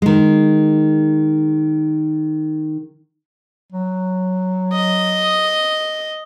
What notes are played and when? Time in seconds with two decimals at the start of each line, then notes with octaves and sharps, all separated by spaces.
0.02 D#3 G#3
3.72 F#3
4.72 D#5